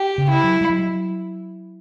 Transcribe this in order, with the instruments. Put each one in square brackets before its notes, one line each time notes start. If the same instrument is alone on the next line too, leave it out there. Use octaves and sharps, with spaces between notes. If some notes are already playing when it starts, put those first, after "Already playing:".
Already playing: [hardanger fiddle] G4
[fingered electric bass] C#3
[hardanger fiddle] E4
[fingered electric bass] F#3
G3
F#3